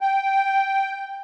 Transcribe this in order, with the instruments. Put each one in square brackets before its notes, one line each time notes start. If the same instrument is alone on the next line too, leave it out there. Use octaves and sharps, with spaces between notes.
[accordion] G5